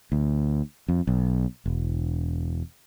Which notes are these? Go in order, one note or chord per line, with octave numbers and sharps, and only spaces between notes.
D2
F2
B1
E1